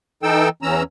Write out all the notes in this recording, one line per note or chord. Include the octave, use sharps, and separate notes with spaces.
E3 D#4 A4 G5 E6
E2 E3 C#4 A#5 E6